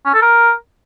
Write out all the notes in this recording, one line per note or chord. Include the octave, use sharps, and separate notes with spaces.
C#4
A4
A#4